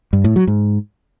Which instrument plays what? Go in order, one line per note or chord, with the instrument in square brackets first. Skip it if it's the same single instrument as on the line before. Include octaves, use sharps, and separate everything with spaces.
[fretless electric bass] G2
A2
F#3
G#2